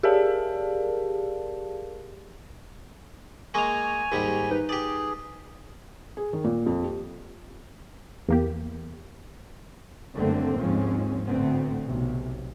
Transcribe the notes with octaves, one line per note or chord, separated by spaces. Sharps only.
G4 G#4 A#4 D5 F5 A5
G#3 A#3 G#5 C#6 F7
D#2 G#2 G3
D#4 B4
G4 G#4 D5
G#4
D#3
A#2
F2
G4
E2 A#3 G4
F#1 G2 D3 A3 A#3 C4
D#2 G#2 F3 G#3 C4 C#4
A1 D2 A3 B3 C4
B1 C3